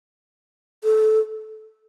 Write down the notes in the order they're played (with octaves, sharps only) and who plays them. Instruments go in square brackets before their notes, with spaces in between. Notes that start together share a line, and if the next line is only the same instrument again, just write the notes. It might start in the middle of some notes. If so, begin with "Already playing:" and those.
[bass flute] A4